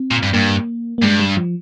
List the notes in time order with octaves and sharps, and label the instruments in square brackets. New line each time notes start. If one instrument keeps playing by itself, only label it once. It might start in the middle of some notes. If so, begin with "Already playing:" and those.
Already playing: [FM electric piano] C4
[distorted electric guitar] A#2
G2
[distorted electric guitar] G2 [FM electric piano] A#3
[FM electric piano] A#3
[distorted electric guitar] G2 [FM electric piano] G#3
[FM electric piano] G3
F3